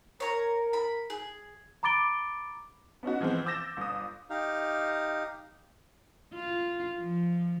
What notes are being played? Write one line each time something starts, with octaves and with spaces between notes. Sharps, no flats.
A#4 C#5 A#5
B5
G#4
A#5 B5 D6 A6 D7 G7
B3 C#4 D#4 F#4
E3 F3 G#3 B3 C4
D6 E6 G6 A6 A#6 E7
G1 D#6
D#4 G4 F5
F4
F3